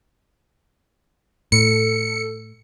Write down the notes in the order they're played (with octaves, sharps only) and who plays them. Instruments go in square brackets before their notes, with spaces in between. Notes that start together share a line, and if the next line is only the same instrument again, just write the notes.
[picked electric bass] A2 [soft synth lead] A4 [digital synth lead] C#7